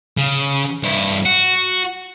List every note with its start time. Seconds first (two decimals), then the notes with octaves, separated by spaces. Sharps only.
0.17 C#3
0.83 G2 E4
1.25 F#4